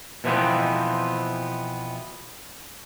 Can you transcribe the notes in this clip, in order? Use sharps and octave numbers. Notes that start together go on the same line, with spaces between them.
B2 E3 F3 G3 B3 C4